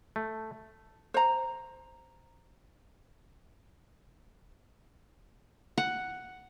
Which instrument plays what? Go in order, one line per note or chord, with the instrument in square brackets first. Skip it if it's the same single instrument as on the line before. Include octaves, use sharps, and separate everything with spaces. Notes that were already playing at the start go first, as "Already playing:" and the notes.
[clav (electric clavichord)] A3
[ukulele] C5 A#5
[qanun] F#5